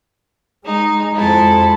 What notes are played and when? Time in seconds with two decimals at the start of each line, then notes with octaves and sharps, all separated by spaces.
0.65 G#3 D#4
1.14 F2 G#3 E4 A4